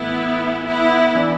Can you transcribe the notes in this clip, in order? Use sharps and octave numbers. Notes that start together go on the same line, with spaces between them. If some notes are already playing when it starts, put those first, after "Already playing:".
Already playing: A2 E3 A3 B3 E4
B3 E4
E3 D4